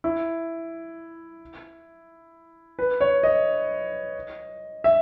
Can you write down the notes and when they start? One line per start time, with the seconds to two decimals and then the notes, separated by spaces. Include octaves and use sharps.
0.04 E4
2.79 B4
3.01 C#5
3.23 D#5
4.84 E5